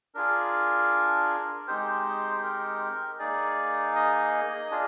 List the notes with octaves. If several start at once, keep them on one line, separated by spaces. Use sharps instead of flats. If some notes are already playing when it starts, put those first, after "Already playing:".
D4 F4 G#4 A#4
G#3 C4 D#4 G4 C5
A#4
A#3 D#4 G#4 D5
D#5
D4 F4 G#4